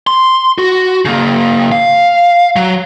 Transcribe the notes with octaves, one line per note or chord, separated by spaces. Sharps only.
C6
F#4
C#3 A#3
F5
F#3